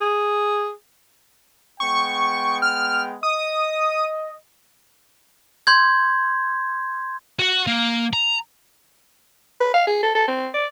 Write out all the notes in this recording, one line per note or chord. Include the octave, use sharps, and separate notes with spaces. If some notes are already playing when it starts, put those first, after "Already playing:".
G#4
G#3 B3 G5 C#6
F6
D#5 D#6
C6 G6 G#6
F#4 F#5
A#3
A#5
B4
F5
G#4
A4
A4
C4
D5